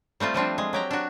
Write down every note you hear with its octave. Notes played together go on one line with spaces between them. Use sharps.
G3 A3 C4 F4
F3 G3 C4 D4
G#3
F#3 G4 A#5
D4 F#4